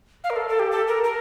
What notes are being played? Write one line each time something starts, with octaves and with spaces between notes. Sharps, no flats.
F5
A#4
A4
A4
G4
A4
A#4
A#4